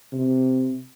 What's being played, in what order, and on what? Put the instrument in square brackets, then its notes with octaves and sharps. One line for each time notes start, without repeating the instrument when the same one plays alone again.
[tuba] C3